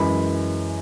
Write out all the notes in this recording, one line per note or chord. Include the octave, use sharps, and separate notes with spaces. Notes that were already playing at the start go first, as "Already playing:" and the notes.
Already playing: F#2 E3 G#3 B5